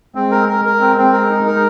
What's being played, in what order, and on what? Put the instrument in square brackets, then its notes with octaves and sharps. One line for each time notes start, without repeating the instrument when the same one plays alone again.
[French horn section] G#3 [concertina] C4
[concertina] A#4
A#4
A#4
C4
C4
A#4
D#4
A#4